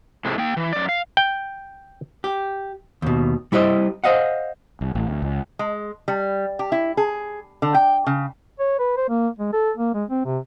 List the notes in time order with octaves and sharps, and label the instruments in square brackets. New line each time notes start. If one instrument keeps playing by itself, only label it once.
[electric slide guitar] A2 C3 G#3 A3
A#3 G5
E3
F#2 D5
F5
[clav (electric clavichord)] G5
[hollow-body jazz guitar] G4
D#2 B2
G3 E4 G4 C5 D#5
C5 D#5 F5 F#5
[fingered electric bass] C2
A1
D2
C#2
[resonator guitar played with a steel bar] G#3
G3
G4
E4
G#4
D3
G5
C#3
[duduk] C#5
B4
C5
A#3
G#3
A4
A#3
G#3
C4
C3